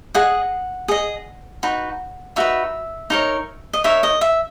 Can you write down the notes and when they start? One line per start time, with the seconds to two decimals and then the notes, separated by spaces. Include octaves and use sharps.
0.15 G#4 D#5 F#5
0.88 G#4 D#5
1.63 D#4 F#4 B4
2.36 D#4 F#4 B4 E5
3.10 D#4 A#4 C#5
3.73 D#5
3.84 D#4 A#4 C#5 E5
4.03 D#5
4.21 E5